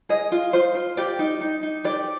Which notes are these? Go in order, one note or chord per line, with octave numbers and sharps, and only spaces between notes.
G#4 D#5
F4
F4 C5
F4
G4 D5
D#4
D#4
D#4
G4 D5